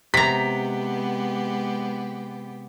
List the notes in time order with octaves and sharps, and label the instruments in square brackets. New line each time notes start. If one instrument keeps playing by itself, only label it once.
[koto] C3 A#5 [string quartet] G#3 B3 G4 [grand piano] B6